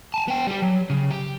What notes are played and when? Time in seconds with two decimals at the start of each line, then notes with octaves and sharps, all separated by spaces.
0.14 G#5 A5
0.28 B3 G5
0.47 G3 G4
0.62 F#3
0.90 C#3
1.10 G4